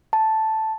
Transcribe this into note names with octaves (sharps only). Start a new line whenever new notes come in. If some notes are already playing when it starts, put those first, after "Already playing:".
A5